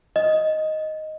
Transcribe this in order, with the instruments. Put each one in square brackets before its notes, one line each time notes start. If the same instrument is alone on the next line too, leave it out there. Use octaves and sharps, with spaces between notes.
[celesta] D#5